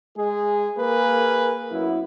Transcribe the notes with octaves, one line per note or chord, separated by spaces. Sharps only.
G#3 G#4
A#3 G#4 A#4 B4
F#2 B3 E4